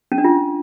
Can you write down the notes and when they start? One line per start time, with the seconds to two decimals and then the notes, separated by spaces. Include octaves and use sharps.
0.12 C#4
0.18 D4
0.24 F4